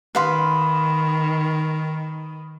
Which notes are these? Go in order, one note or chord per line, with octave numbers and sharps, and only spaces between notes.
D#3 B4 F5 C6